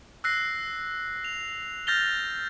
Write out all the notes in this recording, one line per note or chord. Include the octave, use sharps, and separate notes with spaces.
E6 F#6 A#6 C7
F7
F6 G6 A6 A#6 F7 G7